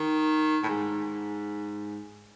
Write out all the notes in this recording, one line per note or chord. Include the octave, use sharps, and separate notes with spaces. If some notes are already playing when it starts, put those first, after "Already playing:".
Already playing: D#3
A2
G#2